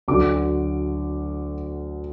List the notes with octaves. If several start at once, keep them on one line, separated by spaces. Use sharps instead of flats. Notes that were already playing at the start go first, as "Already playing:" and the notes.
D2 D3 F#3 D6